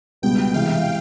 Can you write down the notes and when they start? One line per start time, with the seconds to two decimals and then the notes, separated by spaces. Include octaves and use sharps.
0.22 C#2 B2 G3 B3 G5
0.54 C3 E3 G#3 F5